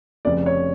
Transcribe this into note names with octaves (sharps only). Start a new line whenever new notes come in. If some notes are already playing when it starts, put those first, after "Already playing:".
F1 F2 C#3 D5
C#5